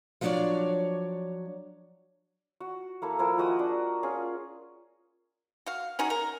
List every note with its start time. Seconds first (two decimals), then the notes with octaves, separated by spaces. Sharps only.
0.21 F3 F#3 B3 D4 C#5 D5
2.60 F#4
3.02 A#3 E4 A4
3.19 F3 E4 A#4
3.38 G#3 F#4 D#6
3.59 D4
4.03 C#4 F4 G#4
5.66 F#4 F5
5.99 C#4 D#4 F#4 G#4
6.10 A#4